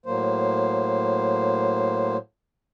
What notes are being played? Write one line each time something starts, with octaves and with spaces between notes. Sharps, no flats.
A2 F#3 A#3 C5